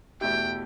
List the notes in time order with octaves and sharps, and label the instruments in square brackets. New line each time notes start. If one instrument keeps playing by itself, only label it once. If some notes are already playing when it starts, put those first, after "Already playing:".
[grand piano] E2 B2 A3 E4 G4 [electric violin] G5